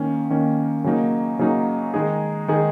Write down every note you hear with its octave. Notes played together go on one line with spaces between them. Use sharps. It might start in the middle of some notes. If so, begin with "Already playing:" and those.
Already playing: D#3 A#3 C#4
D#3 A#3 C#4
C#3 F#3 A#3 D#4
C#3 F#3 A#3 D#4
D#3 G#3 D#4 G#4
D#3 G#3 D#4 G#4